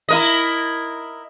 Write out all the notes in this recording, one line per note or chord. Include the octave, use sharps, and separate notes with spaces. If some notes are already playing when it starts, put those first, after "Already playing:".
E4 A#4 D#5